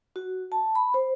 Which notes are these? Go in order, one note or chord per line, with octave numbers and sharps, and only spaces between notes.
F#4
A5
B5
C5